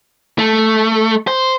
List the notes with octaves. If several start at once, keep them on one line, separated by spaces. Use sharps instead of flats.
A3
C5